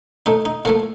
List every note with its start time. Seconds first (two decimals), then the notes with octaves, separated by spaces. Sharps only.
0.26 A2 A3 D#4
0.45 D#4
0.65 A2 F3 A3 A#3